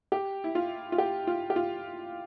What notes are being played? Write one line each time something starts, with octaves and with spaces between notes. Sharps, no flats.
G4
E4
F4
F4
G4
F4
G4
F4